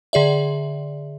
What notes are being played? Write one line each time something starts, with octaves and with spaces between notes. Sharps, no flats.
D3 G#4 D5 E5